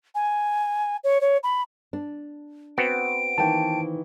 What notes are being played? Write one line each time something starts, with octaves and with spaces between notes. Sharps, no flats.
G#5
C#5
C#5
B5
D4
B3 C4 F#4 D7
D#3 E3 A#3 G5 A5